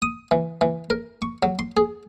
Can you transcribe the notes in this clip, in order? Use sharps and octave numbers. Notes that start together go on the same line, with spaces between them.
D#6
E3
E3
A#4
C#6
F#3
C6
G#4